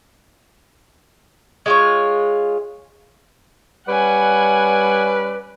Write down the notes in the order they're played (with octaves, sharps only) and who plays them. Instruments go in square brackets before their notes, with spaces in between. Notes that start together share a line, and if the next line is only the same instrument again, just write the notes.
[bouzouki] G#3 F4 C#5
[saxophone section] G3 C#4 D5 [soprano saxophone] B4 [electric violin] F#5 G#5